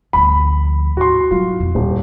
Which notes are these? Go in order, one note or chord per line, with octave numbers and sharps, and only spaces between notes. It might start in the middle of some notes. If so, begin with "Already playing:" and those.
D2 F3 B5
G#2 F#4 C6
F#3 E4 F4
F2
D#1 G#3